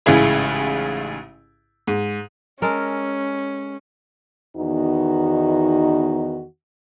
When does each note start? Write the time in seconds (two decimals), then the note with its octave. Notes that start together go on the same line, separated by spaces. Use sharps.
0.06 A1 G#2 C#3 E4 G#4
1.87 G#2
2.62 G#3 C#4 A4 A#4
4.57 E2 D#3 B3 D#4 F#4